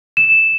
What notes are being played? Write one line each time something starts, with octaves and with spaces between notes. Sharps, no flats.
E7